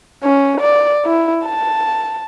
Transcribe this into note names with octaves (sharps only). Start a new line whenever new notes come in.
C#4
D5
E4
A5